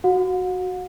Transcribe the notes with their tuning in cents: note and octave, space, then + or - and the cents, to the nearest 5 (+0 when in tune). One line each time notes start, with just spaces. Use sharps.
F#4 +0 F#5 -45